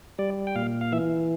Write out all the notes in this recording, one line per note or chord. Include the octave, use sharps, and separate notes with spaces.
G3 D5
G5
A#2 F5
F5
E3 E5